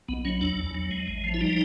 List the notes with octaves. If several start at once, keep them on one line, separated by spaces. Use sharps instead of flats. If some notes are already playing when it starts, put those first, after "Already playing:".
B1 B3
F#3 C#4
E2 D4
E2
F#3
G#3
A1
F3
E4
G3 D#4